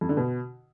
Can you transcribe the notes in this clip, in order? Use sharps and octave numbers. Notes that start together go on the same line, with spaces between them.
F2
D3
B2